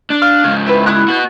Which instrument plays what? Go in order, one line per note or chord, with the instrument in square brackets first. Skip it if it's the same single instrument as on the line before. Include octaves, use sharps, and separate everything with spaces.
[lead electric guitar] D4
[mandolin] F5 F6
[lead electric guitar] G#2 C#3
[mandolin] C4 E4 B4
E4 D#6 F#6
[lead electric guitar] B3 F#4